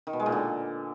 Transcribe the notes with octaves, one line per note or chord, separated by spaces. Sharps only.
D#3
B2
G#3
A#2
D3